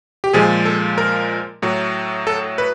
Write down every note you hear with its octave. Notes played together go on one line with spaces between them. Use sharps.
G4
A#2 F3 G#3 G#4
A4
A#4
A2 F#3
A4
B4